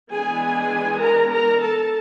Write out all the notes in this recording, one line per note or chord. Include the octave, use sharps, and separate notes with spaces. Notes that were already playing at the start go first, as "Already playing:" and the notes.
E3 G#3 B3 D4 G#4 G#5
A#4 A#5
A#4 A#5
A4 A5